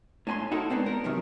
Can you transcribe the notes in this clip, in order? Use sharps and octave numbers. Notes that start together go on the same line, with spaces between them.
A2 D4 G#5 B5 C6
D#4 E4 F#4 A4 A#4
G#2 B3 C4 D4
A#4
F#2 C3 D#3 F3